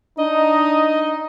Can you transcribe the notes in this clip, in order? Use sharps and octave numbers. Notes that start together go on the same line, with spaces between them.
D4 D#4 D#5